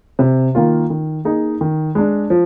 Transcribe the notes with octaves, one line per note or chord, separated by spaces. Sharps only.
C3
D#3 A#3 F4
D#3
A#3 D#4 G#4 D#5
D#3
G#3 D4
F3